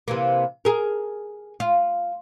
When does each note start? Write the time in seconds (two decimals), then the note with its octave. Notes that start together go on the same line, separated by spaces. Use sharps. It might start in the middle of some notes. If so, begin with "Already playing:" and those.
0.08 C3 E3 A#3
0.65 G#4 A#4
1.60 F4